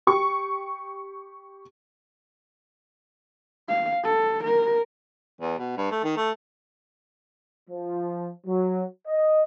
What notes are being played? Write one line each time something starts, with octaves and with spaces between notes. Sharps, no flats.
G4 C#6
F5
A4
A#4
E2
B2
G2
A3
D#3
A3
F3
F#3
D#5